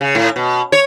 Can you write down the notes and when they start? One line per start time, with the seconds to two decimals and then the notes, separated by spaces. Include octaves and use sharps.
0.01 C#3
0.15 A2
0.36 B2
0.72 C#5